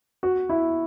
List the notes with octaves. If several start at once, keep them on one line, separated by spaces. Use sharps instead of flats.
F#4
E4